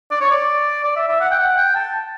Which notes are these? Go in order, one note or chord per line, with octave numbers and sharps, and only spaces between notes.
D5
C#5
D5
D5
E5
E5
F#5
G5
F#5
G5
A5